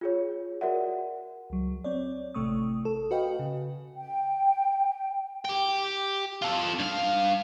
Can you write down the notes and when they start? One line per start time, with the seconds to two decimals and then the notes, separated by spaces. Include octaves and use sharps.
0.01 F4 G#4 C#5
0.61 F#4 A#4 D5 E5 F#5
1.50 C#2 F#3
1.84 C4 C#5 D5
2.35 A1 C3 A3 C#6 D#6
2.85 A4
3.11 F#4 B4 D#5 F5 G5
3.39 C#3
3.98 G5
5.45 G4 G5
6.42 F4 A4
6.79 G2 F5